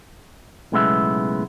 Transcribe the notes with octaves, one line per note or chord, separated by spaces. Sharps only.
B1 A2 C#3 G#3 B3 E5